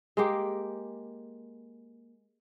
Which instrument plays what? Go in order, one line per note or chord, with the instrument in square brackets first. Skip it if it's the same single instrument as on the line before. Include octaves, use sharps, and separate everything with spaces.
[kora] G#3 A#3 G4